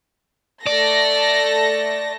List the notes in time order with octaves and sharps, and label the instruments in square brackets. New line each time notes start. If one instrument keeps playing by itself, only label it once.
[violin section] A3 A4 A#6 [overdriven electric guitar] D5